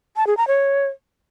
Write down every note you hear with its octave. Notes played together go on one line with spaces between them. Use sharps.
A5
G#4
A#5
C#5